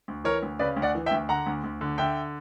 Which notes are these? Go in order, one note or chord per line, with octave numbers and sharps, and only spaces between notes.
D2
E3 A#4 C#5
D2
C#3 B4 D5
D2
D5 F#5
E3
E5 G5
D2
D3 F#5 A#5
D2
D2
D3
D3 E5 G5